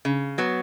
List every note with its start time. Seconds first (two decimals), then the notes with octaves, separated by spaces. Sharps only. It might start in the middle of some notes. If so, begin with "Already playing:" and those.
0.05 C#3
0.38 F#3 B3